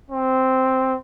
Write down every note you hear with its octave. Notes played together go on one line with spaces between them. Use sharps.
C4